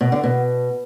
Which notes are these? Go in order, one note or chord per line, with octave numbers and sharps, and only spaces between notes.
B2
D3
B2